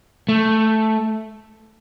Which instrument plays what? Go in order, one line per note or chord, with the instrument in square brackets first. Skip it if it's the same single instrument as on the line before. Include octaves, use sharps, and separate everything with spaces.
[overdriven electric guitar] A3